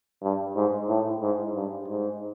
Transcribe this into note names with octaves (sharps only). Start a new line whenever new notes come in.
G2
G#2
A2
G#2
G2
G#2